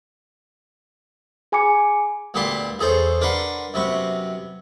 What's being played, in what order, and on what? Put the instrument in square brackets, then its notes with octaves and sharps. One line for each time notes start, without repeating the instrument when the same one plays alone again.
[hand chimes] G#4 G#5 B5 D6 C#7
[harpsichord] D2 A#2 B3 G4 B5 C6
E2 G#4 A4 C5 C#5
D4 A#4 B4 F#5 C6
F#2 C3 B3 C#6